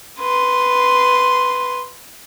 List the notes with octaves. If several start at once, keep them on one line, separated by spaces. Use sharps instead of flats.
B4 C6